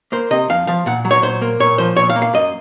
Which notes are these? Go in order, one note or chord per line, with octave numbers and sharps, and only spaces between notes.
A#3 C5
C3 D#5
F2 F5
F3 F5
A#2 F#5
F#3
C#5
A#2 C5
A#3
A#2 C#5
F3 C5
A#2 C#5
F5
A#3
F5
F#2 D#5